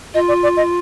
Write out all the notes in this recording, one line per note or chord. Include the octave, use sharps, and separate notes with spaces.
F4 D#5
D5
D5
D#5